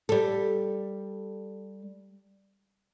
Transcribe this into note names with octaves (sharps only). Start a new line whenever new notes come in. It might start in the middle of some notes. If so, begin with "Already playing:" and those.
G3 A4